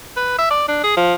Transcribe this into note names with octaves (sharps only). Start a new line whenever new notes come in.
B4
E5
D5
D4
G#4
F3